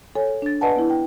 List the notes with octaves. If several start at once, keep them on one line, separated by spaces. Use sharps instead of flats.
A4 C#5 G#5
D4 A6
B4 D5 D#5 F#5 G#5 A5
B3 E4
G5